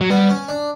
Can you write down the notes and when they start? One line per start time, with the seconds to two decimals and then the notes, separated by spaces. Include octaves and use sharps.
0.01 F#3
0.10 G3 B3
0.29 C#4
0.48 D4